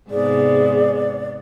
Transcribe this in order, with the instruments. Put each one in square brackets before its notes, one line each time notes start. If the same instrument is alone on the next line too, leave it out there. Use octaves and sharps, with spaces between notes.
[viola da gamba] G#2 C3 B3 [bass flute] G#4 [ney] D5